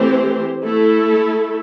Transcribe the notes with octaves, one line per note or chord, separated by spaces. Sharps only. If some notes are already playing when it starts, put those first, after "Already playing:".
Already playing: E3 A3 C4 G4 C5
A3 E4 A4